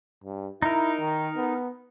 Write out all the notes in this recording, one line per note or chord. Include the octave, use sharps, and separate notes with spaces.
G2
D#4 E4 A#4
D#3
B3